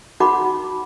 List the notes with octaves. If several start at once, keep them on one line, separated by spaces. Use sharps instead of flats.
D#4 F#4 F#5 B5 D6